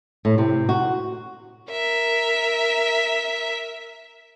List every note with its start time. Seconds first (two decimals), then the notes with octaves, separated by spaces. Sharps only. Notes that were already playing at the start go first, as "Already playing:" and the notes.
0.25 A2
0.38 C3
0.69 F#4
1.71 A#4 E5